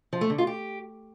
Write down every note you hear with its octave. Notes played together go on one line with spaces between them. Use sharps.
F3
A3
D3
F4
G4